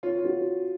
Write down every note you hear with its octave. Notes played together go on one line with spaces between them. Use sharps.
F4 C#5
F4
F#4